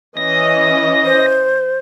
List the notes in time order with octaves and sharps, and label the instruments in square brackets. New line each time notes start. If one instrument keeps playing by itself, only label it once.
[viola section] E3 C#4 D#5 [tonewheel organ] A#6
[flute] C5